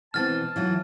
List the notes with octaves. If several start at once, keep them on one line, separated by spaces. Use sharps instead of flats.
B2 E3 C4 A5 F6 A6
E3 F#3 F4